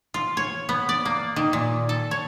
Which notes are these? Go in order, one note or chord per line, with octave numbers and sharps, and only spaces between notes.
F4
C#5
B3
D5
A#3
D#3
A#2
A4
C#5